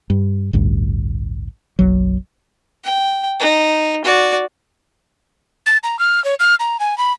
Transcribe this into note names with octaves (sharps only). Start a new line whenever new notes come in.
G2
A1 D2 G2
F#1 B1 F#3
G5
D#4
F#4 D5
A6
A#5
F6
C#5
F6
A#5
G#5
B5